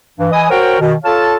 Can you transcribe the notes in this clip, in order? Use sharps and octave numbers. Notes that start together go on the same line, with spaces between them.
G2 E3
E3 D#5 G#5 D#6
F#4 A#4 C5 C#5 F#5 G5
B2 D#3
F4 A4 C#5 F5 A5